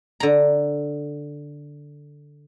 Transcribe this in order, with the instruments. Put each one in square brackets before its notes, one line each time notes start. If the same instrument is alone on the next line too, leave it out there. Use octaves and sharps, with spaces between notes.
[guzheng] D3 A#5